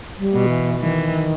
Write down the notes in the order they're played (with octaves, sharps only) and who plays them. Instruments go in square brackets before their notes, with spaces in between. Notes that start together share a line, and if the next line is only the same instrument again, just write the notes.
[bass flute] G3
[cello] B2
[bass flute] E3
[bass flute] D#3 [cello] E3